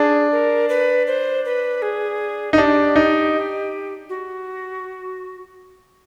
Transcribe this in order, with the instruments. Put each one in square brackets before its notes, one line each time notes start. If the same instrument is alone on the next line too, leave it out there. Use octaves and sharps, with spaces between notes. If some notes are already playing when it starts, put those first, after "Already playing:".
Already playing: [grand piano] D4 [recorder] G#4
[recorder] A#4
B4
C5
B4
G#4
[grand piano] D#4
[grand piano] D4 [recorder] G4
[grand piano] D#4
[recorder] F#4